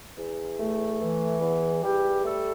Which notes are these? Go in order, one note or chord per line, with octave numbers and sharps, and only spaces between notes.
E2
A3
E3
E2
E2 G3 G4
G3 A3 A4